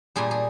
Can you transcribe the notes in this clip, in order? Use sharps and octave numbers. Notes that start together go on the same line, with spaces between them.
A#2 G3 G#4
G#4